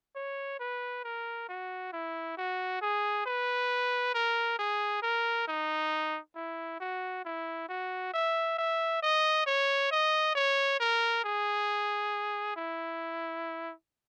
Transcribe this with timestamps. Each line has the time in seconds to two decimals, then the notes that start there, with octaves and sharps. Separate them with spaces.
0.16 C#5
0.60 B4
1.04 A#4
1.49 F#4
1.93 E4
2.37 F#4
2.82 G#4
3.26 B4
4.15 A#4
4.59 G#4
5.03 A#4
5.48 D#4
6.36 E4
6.80 F#4
7.25 E4
7.69 F#4
8.14 E5
8.58 E5
9.03 D#5
9.47 C#5
9.91 D#5
10.35 C#5
10.80 A#4
11.24 G#4
12.57 E4